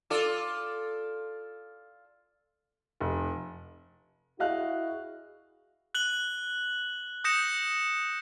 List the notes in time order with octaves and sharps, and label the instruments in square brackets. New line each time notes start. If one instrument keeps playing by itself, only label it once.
[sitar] F4 A4 D5
[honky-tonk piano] F1
[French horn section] E4 F#4 G#4 [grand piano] D#5 F5 F#6
[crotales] F#6 F#7 G7
D#6 G6 A#6 C#7 E7